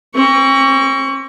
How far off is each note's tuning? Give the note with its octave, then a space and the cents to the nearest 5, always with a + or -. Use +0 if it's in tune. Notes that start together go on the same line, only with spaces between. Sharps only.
C4 +45 C#6 +25